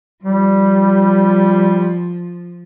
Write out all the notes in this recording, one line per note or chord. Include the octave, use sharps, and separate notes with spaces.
F3 G3